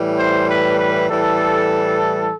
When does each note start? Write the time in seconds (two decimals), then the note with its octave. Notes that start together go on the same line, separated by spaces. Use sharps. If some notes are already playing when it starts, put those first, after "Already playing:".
Already playing: A2 E3 G3
0.18 C5
0.48 B4
0.78 B4
1.09 A2 E3 G3 A4